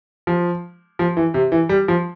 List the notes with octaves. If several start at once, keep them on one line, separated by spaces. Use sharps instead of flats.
F3
F3
E3
C3
E3
G3
F3